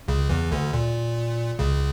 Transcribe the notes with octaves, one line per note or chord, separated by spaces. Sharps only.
C#2 C#3
E2 E3
D2 D3
A#2
C#2 C#3